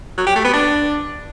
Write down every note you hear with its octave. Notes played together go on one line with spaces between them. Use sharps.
F#3
G4
A3
B3
D4